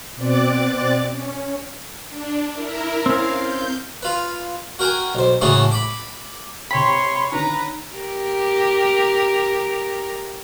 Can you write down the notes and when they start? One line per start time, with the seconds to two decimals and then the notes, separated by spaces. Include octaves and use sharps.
0.16 B2 C4 D5 D6 F#6 A6
1.10 C#4
2.08 D4
2.53 E4 A#4
3.06 C4 C#4 F5
3.38 G6
4.03 F4 B4
4.79 F#4 A#4 G5 G#5
5.15 B1 C5
5.41 A2 C#3 E3 A3 F#4 G#4
5.71 B5 D6
6.71 C3 C#5 G5 B5 C6
7.32 D3 D#3 C#4 B4 A#5
7.95 G4 A#4